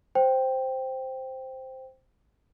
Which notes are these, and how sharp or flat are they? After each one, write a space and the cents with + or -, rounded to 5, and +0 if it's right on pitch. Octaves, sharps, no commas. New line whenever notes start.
C5 +0 G5 +0